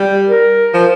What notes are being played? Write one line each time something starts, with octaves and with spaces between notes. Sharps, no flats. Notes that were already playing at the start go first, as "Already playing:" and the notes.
Already playing: G3
A#4
F3